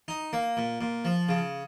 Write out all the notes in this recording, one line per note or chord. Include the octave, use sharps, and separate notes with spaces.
D#4
A#3
A#2
A#2
F3
C#3